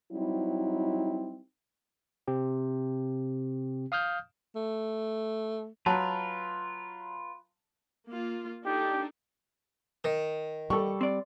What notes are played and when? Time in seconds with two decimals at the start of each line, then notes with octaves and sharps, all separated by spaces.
0.12 F#3 G3 C4 D#4 E4
2.28 C3 C4 G4
3.92 F5 D#6 F6 G6
4.55 A3
5.86 F#3 F4 B4 A5
8.09 A#3 F4
8.66 D4 D#4 G4 A4
10.04 D#3
10.70 G3 A4 C#6
11.01 C4 D5